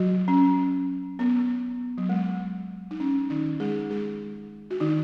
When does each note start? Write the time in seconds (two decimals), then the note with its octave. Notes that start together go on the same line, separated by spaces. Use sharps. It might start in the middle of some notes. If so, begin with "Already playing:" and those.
Already playing: F#3 F#4
0.28 C#4
1.19 B3
1.98 F#3
2.09 G#3
2.91 D#4
3.00 C#4
3.30 D#3 D#4
3.60 G#3 G#4
3.90 G#3 G#4
4.71 F#4
4.80 D#3 D#4